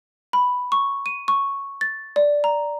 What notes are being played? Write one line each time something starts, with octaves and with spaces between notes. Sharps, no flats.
B5
C#6
D#7
C#6
A6
D5
A#5